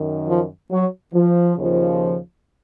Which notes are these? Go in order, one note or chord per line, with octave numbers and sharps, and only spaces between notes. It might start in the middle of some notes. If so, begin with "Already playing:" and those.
Already playing: F#2 D#3
F3
F#3
F3
D#2 C#3 F3